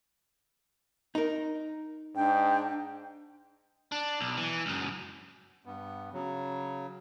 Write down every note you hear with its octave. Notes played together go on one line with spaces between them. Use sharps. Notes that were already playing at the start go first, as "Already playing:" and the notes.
D#4 A#4
G#2 D4 G5
D4
B1
E3
C#2 F#2
G2 B3
C#3 F#3